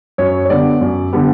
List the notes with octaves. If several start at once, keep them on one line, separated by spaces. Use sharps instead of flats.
F#2 C#5
C#5
D3 G3 B3 D5
F#2
D3 G3 B3